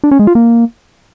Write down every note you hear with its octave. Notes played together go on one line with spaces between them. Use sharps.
D4
C#4
G#3
F4
A#3